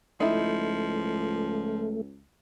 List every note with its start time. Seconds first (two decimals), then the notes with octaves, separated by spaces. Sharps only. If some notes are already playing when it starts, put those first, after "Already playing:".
0.20 C#2 F3 A3 D#4 E4